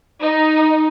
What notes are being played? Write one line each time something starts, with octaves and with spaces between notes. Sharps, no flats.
D#4